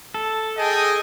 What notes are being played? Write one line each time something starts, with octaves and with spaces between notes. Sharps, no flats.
A4
G#4 D#5 G5